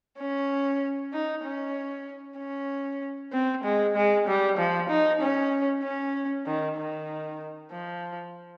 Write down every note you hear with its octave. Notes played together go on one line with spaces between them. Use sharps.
C#4
D#4
C#4
C#4
C4
G#3
G#3
G3
F3
D#4
C#4
C#4
D#3
D#3
F3